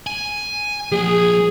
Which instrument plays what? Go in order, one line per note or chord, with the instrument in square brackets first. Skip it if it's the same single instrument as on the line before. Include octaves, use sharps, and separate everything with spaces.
[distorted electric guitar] G#5
[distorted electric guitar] F3 A#3 [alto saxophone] G#4